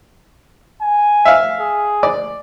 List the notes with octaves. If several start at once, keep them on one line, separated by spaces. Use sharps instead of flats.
G#5
E5 F5
G#4
D5